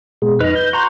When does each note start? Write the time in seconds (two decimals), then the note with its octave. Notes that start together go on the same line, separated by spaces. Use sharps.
0.22 B2 G#3
0.40 F2 D#4 B4 D#5 F6
0.56 G6
0.73 F#4 A#5 C6